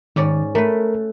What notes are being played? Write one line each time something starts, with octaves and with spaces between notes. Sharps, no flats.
G#2 D#3 C#4 D5
A3 A#4 B4